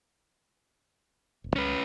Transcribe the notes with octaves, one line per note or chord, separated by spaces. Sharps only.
D#1
C#2 G#3 C#4 B4